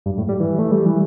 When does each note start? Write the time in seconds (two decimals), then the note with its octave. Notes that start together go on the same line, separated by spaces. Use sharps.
0.06 G2
0.18 A2
0.29 G3
0.40 E3
0.59 A3
0.71 G3
0.86 E3